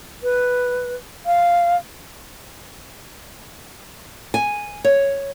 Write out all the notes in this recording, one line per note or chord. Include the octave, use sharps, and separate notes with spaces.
B4
F5
G#5
C#5